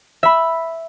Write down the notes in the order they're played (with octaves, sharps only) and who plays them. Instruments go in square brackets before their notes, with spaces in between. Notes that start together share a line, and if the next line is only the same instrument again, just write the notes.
[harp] E5 B5